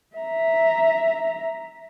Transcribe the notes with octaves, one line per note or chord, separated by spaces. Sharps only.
E5 A#5